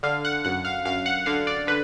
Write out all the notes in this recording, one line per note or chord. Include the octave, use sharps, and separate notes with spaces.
D3 F5
F#5
F#2 F#5
F5
F#2 F5
F#5
D3 F5
D5
D3 B4